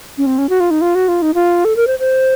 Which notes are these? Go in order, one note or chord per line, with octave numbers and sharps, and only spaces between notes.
C#4
C4
C#4
F#4
F4
D#4
F4
F#4
F4
D#4
F4
A4
A#4
C5
C5